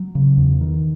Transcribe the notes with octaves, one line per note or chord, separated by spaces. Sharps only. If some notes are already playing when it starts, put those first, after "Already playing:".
Already playing: F#3
C#3
E2
D#3